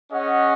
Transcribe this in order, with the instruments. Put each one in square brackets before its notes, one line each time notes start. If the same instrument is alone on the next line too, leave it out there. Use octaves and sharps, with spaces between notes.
[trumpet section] C#4 G#4 D#5 F#5